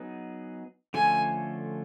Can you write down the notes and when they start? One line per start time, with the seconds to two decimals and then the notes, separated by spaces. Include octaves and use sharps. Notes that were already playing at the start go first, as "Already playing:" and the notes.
Already playing: F#3 B3 D#4 G#4
0.94 D3 F3 A3 C#4 F4 G#5